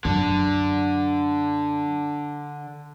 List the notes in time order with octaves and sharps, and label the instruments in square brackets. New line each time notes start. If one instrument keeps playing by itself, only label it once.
[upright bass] F#2 F#3 [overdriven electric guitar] D3